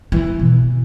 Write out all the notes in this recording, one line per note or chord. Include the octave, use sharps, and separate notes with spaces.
E3
B2